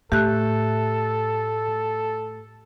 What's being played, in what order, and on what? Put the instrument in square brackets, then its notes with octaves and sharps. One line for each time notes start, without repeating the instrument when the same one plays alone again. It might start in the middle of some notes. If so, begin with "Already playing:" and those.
[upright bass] A2 [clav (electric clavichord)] A3 [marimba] G4 F#6 [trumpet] A4